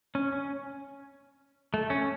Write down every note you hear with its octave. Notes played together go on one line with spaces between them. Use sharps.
C#4
C#4
A3
C#4